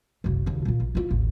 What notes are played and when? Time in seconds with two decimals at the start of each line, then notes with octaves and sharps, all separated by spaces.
0.24 F#1 C2
0.46 D#2 C#3
0.65 A#2 F4
0.80 A#1
0.95 E4 F4
1.11 A1 D#2